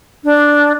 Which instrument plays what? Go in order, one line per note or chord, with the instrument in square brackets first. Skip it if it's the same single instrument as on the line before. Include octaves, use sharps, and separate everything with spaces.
[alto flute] D4